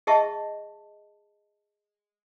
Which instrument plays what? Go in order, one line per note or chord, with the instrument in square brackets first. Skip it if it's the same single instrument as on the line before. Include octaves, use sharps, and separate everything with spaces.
[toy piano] G#4 D#5 E5 F#5 A5 C#6